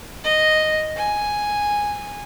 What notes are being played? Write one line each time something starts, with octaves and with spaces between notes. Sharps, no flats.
D#5
G#5